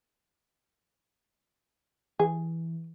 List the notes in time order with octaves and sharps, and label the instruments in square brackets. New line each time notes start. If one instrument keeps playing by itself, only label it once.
[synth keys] E3 [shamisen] G#4